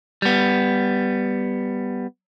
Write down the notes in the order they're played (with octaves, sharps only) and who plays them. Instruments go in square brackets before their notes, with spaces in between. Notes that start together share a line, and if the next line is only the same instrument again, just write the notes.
[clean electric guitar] G3 B3